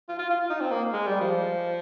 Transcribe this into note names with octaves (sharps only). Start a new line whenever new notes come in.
F4
F4
F4
F4
D#4
C4
A#3
G#3
G3
F3